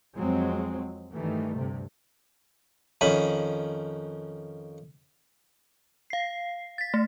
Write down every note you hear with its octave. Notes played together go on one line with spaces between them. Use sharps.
F2 F#3 G#3 C4
G2 D#3 E3 G3 A3
D2 G2 C3
F2 D#3 C#4 B5
F5 C7
A6 B6
A3